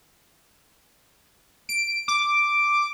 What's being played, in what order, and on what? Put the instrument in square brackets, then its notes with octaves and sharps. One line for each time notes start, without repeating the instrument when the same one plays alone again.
[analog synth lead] D7
D6